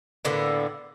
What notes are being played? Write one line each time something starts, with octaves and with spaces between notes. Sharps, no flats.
A2 D3 A#3 B3